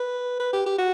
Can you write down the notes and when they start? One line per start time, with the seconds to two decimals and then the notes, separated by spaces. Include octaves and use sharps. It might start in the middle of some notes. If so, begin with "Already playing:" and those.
Already playing: B4
0.40 B4
0.53 G4
0.66 G4
0.79 F#4